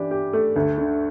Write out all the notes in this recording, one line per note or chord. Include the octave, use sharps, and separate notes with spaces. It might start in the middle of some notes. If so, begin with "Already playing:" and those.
Already playing: E3 D4 G4
G4
A3
D2
D3